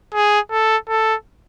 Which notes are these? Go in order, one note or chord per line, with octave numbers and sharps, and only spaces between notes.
G#4
A4
A4